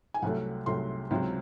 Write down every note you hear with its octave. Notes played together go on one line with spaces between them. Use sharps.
G#5
C2 C3 F#3 A3 F#5
C2 C3 F#3 A3 C6
C#2 C3 F#3 C4